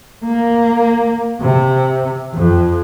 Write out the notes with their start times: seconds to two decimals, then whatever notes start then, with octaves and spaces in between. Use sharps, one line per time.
0.25 A#3
1.41 C3
2.34 F2